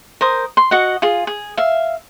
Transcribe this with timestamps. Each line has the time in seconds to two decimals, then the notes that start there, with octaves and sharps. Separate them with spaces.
0.21 A#4 C5 D#6
0.57 C6
0.71 F#4 D#5 F#5
1.02 F4 G#4
1.27 G#4
1.57 E5 F5